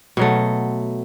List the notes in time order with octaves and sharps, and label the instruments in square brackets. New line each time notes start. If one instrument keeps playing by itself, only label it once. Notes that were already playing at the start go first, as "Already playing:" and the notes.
[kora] B2 F#3 A3